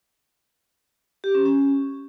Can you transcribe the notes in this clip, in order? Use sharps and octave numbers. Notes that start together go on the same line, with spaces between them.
G4
C#4
C#4